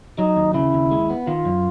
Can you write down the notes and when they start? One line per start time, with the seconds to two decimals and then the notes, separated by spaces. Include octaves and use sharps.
0.19 F#3 D#4
0.36 D#2
0.54 C#3 E4
0.73 D#2
0.91 G#3
1.09 B3
1.27 D#3 F4
1.45 F#2